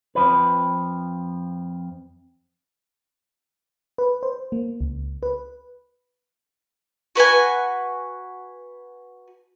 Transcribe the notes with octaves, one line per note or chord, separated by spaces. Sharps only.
F2 F3 B4
B4
C5
A#3
C#2
B4
F#4 B4 F#5 G#5